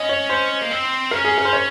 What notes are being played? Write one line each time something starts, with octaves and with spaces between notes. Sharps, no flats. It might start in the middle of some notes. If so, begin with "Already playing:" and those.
Already playing: C#4 D#5
C#5
C5
A#3
C4
C#4 A#4
G#4
A#4
C5
C#5